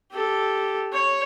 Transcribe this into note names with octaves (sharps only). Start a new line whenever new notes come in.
G4 A4
C#5